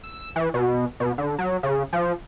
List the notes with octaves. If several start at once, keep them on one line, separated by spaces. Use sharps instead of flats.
E6
E3
B2
B2
D3
F#3
C#3
F3